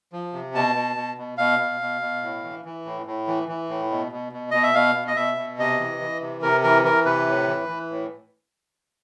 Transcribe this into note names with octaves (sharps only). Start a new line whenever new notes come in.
F3
C3
B2 A5
B2
B2
B2
B2 F5
B2
B2
B2
A2
E3
E3
A2
A2
E3
E3
A2
B2
B2
B2
B2 D#5
E5
B2 F5
B2
D#5
B2 E5
B2
C3 D#5
E3
E3
C3
C3 A#4
E3 A#4
E3 A#4
C3 B4
A2
E3
E3
A2